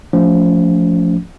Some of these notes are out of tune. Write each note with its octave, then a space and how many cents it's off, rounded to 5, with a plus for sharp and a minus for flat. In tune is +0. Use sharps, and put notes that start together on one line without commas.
F3 +0 A3 +0 C#4 +40